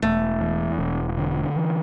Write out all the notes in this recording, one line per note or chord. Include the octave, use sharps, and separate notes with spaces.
E1 A3
E2
E1
D3
E3